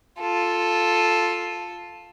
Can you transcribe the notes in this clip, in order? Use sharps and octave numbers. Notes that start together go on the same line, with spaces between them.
F4 A4